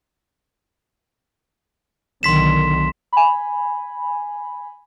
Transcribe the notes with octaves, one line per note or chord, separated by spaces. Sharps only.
B1 D3 D#3 C6 B6 E7
G#5 B5